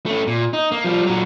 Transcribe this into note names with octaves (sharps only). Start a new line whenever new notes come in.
A3 C#4
A#2
D#4
A#3
F3 G3
A#2 F#3